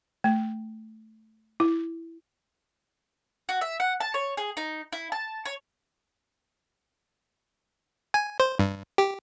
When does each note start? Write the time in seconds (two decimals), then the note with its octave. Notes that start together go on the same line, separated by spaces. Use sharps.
0.24 A3
1.60 E4
3.49 F#4
3.61 E5
3.80 F#5
4.00 A5
4.14 C#5
4.37 G#4
4.57 D#4
4.92 E4
5.12 A5
5.45 C#5
8.14 G#5
8.40 C5
8.59 G2
8.98 G4